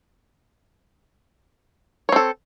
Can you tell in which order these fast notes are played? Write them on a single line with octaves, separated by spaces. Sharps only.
C#5 C4 A4